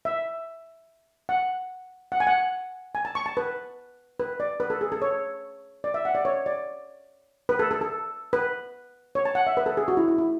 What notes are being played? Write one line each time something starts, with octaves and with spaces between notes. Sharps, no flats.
E5
F#5
F#5
G#5
F#5
G#5
A5
C#6
A5
B4
B4
D5
B4
A4
G#4
A4
C#5
D5
E5
F#5
D5
C#5
D5
B4
A4
A4
A4
B4
C#5
A5
F#5
E5
B4
A4
G#4
F#4
E4
E4
E4